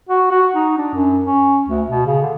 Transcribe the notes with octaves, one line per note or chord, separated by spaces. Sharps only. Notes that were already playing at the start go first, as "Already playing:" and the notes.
F#4
F#4
D#4
D4
F#2
C#4
D2
B2
C#3
D3